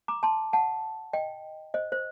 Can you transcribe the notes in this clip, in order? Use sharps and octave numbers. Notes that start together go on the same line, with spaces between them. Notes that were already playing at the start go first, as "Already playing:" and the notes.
A#5 D6
A5 C6
F#5 A5
D#5 G5
C5 D#5
C5